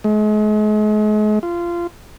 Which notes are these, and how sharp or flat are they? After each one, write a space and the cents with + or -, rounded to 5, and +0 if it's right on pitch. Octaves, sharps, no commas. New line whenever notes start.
G#3 +40
F4 -20